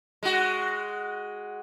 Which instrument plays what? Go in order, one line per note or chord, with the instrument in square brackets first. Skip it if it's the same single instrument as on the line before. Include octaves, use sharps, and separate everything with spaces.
[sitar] G#3 F#4